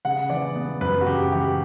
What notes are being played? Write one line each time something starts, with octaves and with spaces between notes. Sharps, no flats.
C#3 F#5
E3 D5
B3
F#2 B4
F#4
C#3 G4
E3 G4